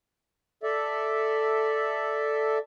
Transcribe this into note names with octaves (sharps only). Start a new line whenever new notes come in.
A4 D5 E5